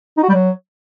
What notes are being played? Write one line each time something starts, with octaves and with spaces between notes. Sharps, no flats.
D#4
F#4
G3
F#3